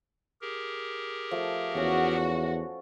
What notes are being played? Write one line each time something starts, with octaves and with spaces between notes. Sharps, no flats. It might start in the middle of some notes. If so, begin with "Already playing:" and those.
G4 G#4 A#4
F3 A3
E2 C#4 F#4 D5